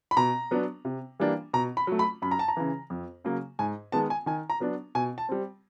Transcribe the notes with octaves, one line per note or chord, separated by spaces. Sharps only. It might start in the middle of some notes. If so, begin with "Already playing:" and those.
B5
B2 A#5
F#3 B3 D4
C3
E3 G3 A#3 D4
B2 A#5
B5
F#3 A3
B5
F#2 B5
A#5
A5
A#5
C#3 E3
F2
C#3 F#3 A#3
G#2 G#5
D#3 G#3 B3 A5
G#5
D#3 G#5
A#5
F#3 B3 D4
B2 G#5
A5
G3 C4